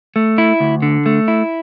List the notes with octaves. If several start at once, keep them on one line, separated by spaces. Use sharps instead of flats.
A3
E4
D2
D3
A3
E4